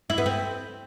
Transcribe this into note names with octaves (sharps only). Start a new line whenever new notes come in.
E4
B3
C4